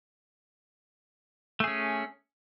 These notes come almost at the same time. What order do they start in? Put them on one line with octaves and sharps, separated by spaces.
A3 G#4 C#4